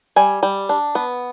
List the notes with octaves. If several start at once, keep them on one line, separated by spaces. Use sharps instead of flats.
G3 G#5
G3
D4
B3